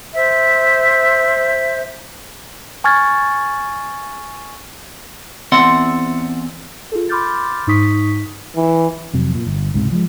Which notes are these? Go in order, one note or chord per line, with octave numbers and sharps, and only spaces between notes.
C5 E5
G#5 C#6 F6 G#6 A6
E2 C4 D5 E5 F#5 C6
F4 G#4 A4
B5 C6 D6 F6 G6 A6
G#2 D#4 C#6 D#6 B6
E3
F2 C3 F#3
A#2
G1
C#2 G#2 C3
F3 G#3